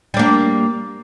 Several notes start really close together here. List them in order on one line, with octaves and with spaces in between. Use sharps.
G3 D4 A#3